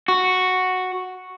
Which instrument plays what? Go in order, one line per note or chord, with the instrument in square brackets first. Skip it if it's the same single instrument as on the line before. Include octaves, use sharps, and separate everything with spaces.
[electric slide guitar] F#4